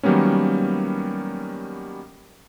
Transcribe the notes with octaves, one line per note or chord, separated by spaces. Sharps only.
D#3 F#3 G3 A#3 B3 C#4